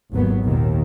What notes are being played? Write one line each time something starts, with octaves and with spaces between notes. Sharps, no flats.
G#1 D#2 F#3 B3
D#2 A#2 D#3